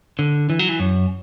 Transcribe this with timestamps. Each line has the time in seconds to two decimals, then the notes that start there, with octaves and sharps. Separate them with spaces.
0.19 D3
0.50 E3
0.59 F#3
0.69 E3
0.80 F#2